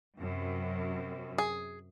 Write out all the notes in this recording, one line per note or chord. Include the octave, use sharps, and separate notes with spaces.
F#2 C3
G#4